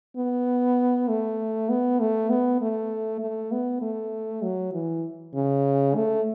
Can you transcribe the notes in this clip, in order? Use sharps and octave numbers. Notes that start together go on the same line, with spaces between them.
B3
A3
B3
A3
B3
A3
A3
B3
A3
F#3
E3
C#3
A3